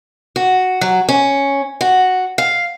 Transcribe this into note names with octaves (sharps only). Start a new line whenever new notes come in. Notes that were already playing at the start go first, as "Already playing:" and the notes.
F#4
F#3
C#4
F#4
F5